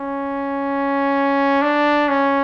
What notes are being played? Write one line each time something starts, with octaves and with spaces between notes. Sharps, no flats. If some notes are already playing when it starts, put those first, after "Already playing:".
Already playing: C#4
D4
C#4